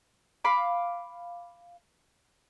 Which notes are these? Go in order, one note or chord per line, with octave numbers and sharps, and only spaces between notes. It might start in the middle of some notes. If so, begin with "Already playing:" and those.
F5 B5 D6